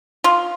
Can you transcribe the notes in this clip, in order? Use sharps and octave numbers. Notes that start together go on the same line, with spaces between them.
F4